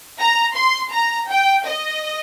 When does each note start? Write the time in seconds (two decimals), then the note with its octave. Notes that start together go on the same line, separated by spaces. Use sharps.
0.20 A#5
0.56 C6
0.93 A#5
1.30 G5
1.66 D#5